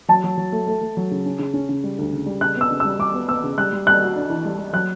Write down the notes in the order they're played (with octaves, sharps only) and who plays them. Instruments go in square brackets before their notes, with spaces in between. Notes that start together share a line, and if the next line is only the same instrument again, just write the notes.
[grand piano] F#3 [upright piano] A5
[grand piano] F#3
F#3
A3
A3
A3
F#3
C#3
C#4
C#3
C#4
C#3
G3
D2
C#3
G3
[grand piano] C#3 [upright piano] F#6
[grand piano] B3
[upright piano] E6
[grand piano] C#3
[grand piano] G3 [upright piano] E6
[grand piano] G3 [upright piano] D6
[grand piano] B3
[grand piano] B3 [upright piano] E6
[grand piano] C#3
[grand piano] G3 [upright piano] F#6
[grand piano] G3
[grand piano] G3 [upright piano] F#6
[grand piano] F#4
D4
E3
G3
G3
[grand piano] F#3 [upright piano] F#6